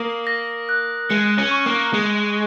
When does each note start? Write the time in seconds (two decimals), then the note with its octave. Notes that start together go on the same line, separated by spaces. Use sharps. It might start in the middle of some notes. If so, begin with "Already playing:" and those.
Already playing: A#3 D#6
0.27 A#6
0.69 F#6
1.10 G#3 C#7
1.38 C#4
1.51 C#6
1.66 A#3
1.94 G#3 C#7